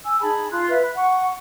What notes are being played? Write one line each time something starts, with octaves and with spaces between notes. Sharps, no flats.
G#5 E6
D#4 G#4 A5 B5
F4 C6 F#6
B4 E5
B5 F#6
F#5 C#6